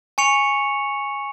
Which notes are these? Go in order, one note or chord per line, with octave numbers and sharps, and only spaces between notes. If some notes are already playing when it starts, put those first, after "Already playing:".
G#5 C#6 C#7 F7